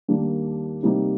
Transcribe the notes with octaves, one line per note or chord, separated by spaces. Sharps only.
D#2 D#3 G3 A#3 D4
C3 G3 A#3 D#4